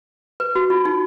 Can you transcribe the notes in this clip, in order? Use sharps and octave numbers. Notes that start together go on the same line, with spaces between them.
B4
F#4
F4
D#4